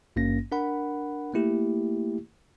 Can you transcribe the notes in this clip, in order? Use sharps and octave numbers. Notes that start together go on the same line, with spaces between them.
G#1 G2 A#3 C#4 A#6
D4 A#4 F#5 B5
A3 A#3 E4 G4